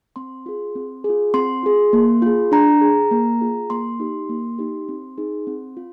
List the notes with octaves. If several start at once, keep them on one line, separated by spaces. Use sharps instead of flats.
C4 C6
F4 G#4
C4
F4 G#4
C4 C6
F4 G#4
A#3
F4 G#4
D4 A#5
G#4
A#3
F4 G#4
A#3 C6
D#4 G4
A#3
D#4 G4
C4
D#4 G#4
C4
F4